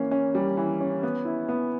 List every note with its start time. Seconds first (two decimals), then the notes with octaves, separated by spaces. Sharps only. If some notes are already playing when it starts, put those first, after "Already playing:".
Already playing: E3 A#3 C#4
0.11 C#4
0.35 G3
0.57 E3
0.80 C#4
1.03 B3
1.25 E4
1.49 B3